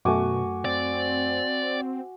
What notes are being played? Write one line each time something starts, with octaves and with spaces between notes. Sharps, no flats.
F#2 B2 A3 F#4 G#5 D6
C4 D5